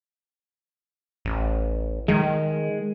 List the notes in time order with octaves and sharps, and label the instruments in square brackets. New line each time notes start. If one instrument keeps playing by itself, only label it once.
[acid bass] A1
[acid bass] D#3 [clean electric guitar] G#3